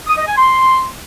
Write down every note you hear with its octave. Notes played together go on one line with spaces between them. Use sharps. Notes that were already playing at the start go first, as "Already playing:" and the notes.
D#6
D#5
G#5
C6